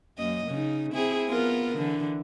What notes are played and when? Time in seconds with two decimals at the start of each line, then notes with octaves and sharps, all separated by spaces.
0.18 F#2 A#3 D#5
0.47 C#3 D#4
0.94 C4 E4 G#4
1.29 B3 F4 A#4
1.76 D3 E3